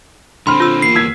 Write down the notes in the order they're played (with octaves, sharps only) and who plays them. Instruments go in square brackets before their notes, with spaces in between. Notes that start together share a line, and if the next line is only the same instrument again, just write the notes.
[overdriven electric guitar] D3 C4 [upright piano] B5 F6 [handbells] C6
[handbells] F4 E6
[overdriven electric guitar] E2 A#3 [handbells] C7
[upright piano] E6 G#6 B6